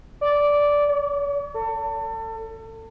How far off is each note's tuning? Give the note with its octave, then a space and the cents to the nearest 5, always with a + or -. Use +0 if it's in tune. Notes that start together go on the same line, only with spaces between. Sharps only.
D5 -10
C#5 +45
A4 +30